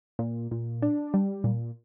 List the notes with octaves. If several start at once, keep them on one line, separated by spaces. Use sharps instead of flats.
A#2
A#2
D4
G3
A#2